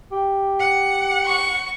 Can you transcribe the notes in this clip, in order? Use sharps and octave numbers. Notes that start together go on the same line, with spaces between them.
G4
F#5
C#6